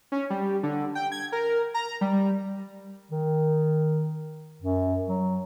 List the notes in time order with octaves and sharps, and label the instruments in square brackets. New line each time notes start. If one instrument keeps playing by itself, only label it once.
[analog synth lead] C#4
G3
D3
G5
G#6
A#4
A#5
G3
[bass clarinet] D#3
F#2
F#3